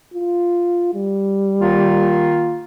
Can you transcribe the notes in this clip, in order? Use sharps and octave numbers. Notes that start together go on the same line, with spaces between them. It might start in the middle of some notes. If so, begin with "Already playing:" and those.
F4
G3
D#3 A#3 F4